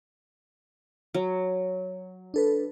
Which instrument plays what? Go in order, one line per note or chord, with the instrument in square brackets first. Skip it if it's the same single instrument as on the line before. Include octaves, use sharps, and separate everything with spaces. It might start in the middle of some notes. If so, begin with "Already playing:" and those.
[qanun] F#3
[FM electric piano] D4 A4 B4